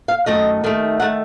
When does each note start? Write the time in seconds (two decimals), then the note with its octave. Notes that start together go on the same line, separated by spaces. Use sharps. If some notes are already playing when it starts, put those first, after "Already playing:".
0.08 F5
0.26 F#2 D#3 A3 D#5
0.64 D#2 D#3 A3
1.00 D#3 A3 F#5